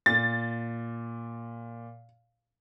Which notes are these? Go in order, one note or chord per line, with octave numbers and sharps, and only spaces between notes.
A#2 A6